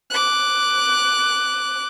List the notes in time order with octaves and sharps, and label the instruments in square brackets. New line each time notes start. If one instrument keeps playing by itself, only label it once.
[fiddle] D6 F#6